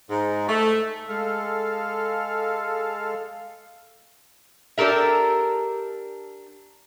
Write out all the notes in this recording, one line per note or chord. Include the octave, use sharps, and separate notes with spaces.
G#2
A3
G#3 A4 F5
D4 G4 A4 A#4 E5